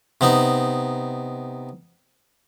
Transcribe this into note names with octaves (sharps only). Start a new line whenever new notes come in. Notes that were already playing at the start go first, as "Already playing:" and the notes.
C3 B3 D#4